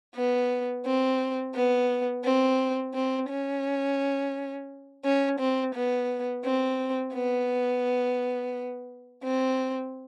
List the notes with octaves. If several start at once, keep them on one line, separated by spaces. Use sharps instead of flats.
B3
C4
B3
C4
C4
C#4
C#4
C4
B3
C4
B3
C4